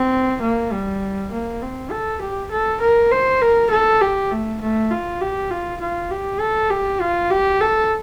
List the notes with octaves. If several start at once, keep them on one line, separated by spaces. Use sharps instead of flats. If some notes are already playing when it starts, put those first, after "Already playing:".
Already playing: C4
A#3
G3
A#3
C4
A4
G4
A4
A#4
C5
A#4
A4
G4
A3
A3
F4
G4
F4
F4
G4
A4
G4
F4
G4
A4